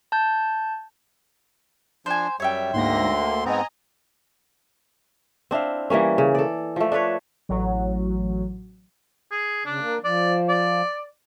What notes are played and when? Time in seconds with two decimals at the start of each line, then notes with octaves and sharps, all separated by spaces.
0.12 A5 G6
2.06 F3 D4 C5 G#5
2.40 F#2 G3 C#5 E5 G5
2.73 D2 G#2 D3 A#3 C6 A#6
3.19 A#3
3.45 G#2 B3 C4 D#5 G#5 A#5
5.51 C4 D4 E4 F5
5.90 E3 G3 A#3 C#4
6.18 C#3
6.35 A4 D5
6.76 F3 A3
6.92 D4 A4 B4 C#5
7.49 A1 F#3
9.31 G#4
9.66 C#3 D4
9.80 A#3
10.04 F3 D5
10.49 D5